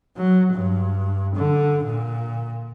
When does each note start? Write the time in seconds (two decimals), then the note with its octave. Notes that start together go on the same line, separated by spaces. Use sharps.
0.16 F#3
0.53 G2
1.36 D3
1.84 A#2